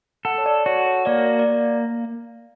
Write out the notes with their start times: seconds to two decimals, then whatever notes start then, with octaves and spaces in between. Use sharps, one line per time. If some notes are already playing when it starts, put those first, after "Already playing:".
0.25 A4 F#5
0.38 C#5
0.46 D5
0.66 F#4 C#5
0.86 C#5
1.06 A#3 D5
1.26 D5
1.39 D5